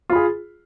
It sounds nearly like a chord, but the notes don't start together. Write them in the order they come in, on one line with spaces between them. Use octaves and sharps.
F4 B5 G#4